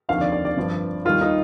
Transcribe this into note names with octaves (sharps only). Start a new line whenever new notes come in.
F1 D#2 D3 F3 F5
D5
D5
D5
G1 G2 F3
D#2 D#3 G3 F4
D#4